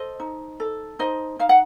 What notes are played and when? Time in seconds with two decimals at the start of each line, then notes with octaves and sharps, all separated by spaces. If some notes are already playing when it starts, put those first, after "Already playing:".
Already playing: A4 C5 D#5
0.20 D#4
0.60 A4
0.99 D#4 C5 D#5
1.39 D#4 F5
1.49 F#5